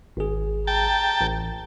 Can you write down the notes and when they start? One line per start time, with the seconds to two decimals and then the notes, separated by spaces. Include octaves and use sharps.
0.17 G#1 G#4
0.67 G5 A5 A#5
1.21 A1